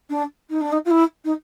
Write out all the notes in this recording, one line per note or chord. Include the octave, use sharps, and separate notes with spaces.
D4
D#4
D4
D#4
F4
E4
D#4